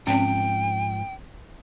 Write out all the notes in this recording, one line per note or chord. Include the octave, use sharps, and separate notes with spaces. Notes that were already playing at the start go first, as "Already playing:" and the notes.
G#2 F3 C4 C#4 G5